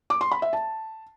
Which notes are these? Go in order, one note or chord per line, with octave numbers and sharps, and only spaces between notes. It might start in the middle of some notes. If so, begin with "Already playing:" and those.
D6
C6
B5
E5
A5